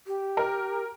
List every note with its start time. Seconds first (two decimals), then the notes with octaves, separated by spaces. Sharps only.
0.07 G4
0.37 A#4